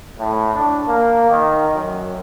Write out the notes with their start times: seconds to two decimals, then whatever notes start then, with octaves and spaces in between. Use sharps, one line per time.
0.18 A2
0.54 D4
0.87 A#3
1.29 D#3
1.73 F#2